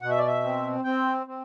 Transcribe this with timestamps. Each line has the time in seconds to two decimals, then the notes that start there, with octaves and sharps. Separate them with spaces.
0.01 B2 F#5
0.11 E5
0.18 D5
0.27 E5
0.43 C4
0.84 C4 G5
1.27 C4